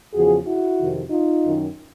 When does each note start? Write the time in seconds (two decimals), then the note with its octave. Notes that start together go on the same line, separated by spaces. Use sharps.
0.14 E2 C#3 F3 F#4 G#4
0.46 E4 F#4
0.79 F2 C3 D#3
1.11 D#4 F4
1.43 F#2 D#3